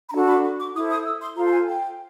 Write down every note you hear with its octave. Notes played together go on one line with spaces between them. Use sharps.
B5
D4 F#4 A4 A#5
B5
C#6
D6
E4 A4 C5 D#6
D#6
E6
C6
F4 A4 C5 A#5
A5
G#5
G5